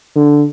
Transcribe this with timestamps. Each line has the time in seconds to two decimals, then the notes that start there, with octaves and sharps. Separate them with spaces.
0.16 D3